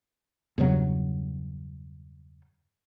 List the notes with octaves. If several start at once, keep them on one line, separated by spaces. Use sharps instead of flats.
E2 G2 C#3 F#3